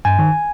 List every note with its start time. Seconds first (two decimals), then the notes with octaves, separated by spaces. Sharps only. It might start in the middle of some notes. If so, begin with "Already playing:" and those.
0.05 G2 G#5
0.19 D#3